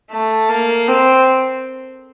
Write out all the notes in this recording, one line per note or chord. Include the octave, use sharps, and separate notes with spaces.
A3
A#3
C4